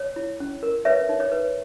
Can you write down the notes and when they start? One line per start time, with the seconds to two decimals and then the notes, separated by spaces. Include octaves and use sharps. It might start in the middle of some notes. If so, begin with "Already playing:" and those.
Already playing: C#5
0.16 E4
0.40 C#4
0.63 A#4
0.85 B4 C#5 E5
1.09 D#4
1.20 C#5
1.31 B4